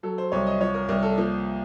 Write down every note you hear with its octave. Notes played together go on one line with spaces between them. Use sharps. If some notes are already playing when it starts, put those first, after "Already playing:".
F#3 A4
C5
C2 C#5
D#5
F3 C#5
A#4
C2 A#4
A4
F3 A#3